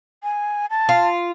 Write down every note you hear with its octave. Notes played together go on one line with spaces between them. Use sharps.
G#5
A5
F4